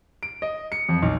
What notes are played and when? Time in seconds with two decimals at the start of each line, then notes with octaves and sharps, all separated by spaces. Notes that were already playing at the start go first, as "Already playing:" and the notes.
0.23 D7
0.42 D#5
0.72 C#7
0.89 F2
1.02 B1